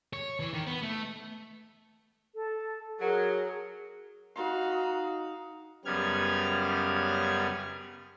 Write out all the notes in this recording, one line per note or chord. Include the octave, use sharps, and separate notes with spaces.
C#5
E3
D#3
B3
A3
A4
F#3 G#4 A#4
D#4 F#4 F5 C6
F#2 C#3 G3 B3 F6 G#6